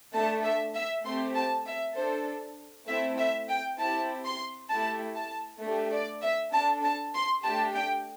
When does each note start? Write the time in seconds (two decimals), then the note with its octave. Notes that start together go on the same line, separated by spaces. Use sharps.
0.13 A3 D4 A4 A5
0.44 E5
0.74 E5
1.05 A3 C4 G4 C6
1.35 A5
1.66 E5
1.96 D4 A4 C5
2.87 A3 C4 E4 E5
3.18 E5
3.48 G5
3.78 C4 E4 G4 A5
4.25 C6
4.70 A3 E4 G4 A5
5.16 A5
5.61 A3 D4 G4
5.91 D5
6.22 E5
6.52 D4 A4 A5
6.83 A5
7.14 C6
7.44 A3 D4 G4 A5
7.74 G5